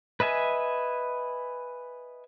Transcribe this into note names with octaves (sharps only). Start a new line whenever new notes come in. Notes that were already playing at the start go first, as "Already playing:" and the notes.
B4 D#5 E5 G#5